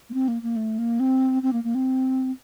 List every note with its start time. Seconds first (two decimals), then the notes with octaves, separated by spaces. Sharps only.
0.10 A#3
0.14 C4
0.28 A#3
0.42 A#3
0.56 A3
0.78 A#3
1.00 C4
1.43 C4
1.53 A#3
1.64 A#3
1.75 C4